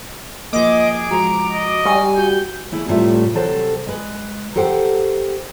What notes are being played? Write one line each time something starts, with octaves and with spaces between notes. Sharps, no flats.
F3 A#3 G#4 D#5 D6
F3 G#3 F#4 A#5
D#5
G3 F5 G#5 C#6
F#4 G6
A3 E4 G#4
A2 C3 G3 A3 F4 E5
C3 F#3 A4 C5
G#3 B4
G4 A4 A#4 C5 F#5 G5